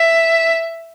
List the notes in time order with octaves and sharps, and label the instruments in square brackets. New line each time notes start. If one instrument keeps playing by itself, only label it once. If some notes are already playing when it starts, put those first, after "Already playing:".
Already playing: [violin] E5